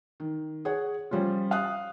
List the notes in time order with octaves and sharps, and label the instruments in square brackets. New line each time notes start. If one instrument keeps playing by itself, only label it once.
[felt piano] D#3
G#4 C#5 F#5
F3 G3 C#4 F4
F5 D#6 F#6